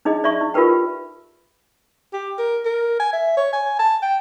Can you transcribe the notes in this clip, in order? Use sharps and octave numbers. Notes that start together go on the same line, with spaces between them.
D4 D#4 G#4 D#5
D5 E5 C#6
D#4
F4 G4 A#4 B4 G5
G4
A#4
A#4
G#5
E5
C#5
G#5
A5
G5